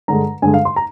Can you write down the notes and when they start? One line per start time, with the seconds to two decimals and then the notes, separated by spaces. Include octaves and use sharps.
0.08 G2 D3 G#3 A#5
0.42 G2 D3 G#3 G#5
0.54 F5
0.65 C6
0.76 A#5